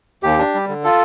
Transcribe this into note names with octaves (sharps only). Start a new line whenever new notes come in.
D#2 G4
D4
G3
D3
F4 A4